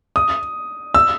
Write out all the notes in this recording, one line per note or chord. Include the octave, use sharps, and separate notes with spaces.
D#6
E6